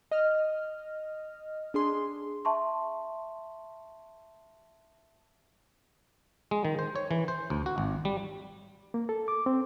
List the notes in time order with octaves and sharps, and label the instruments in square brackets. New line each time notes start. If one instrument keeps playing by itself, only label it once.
[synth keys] D#5 F6
D4 G#4 C6
[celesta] E5 A5 C6 C#6
[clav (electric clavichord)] G#3
D#3
C5
C#5
E3
C5
D2
F#4
G#1
G3
[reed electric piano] A#3
A4
D6
C4